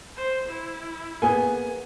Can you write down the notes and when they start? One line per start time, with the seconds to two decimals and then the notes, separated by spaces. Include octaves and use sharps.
0.16 C5
0.48 E4
1.22 A#3 B3 G#4 G#5